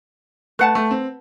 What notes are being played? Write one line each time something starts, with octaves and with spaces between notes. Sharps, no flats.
A3 B4 F#5 A5
A3
C4